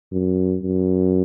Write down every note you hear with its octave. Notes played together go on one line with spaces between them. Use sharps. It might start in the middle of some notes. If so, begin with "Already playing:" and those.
F#2
F#2